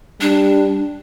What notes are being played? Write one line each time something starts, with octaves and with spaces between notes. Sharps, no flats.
G3 D4